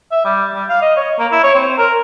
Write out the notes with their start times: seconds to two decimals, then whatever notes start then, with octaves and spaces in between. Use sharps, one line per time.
0.11 E5
0.24 G3
0.54 G3
0.69 F5
0.82 D#5
0.96 C#5
1.19 A#3
1.32 E4
1.43 C#5
1.55 C4
1.78 A#4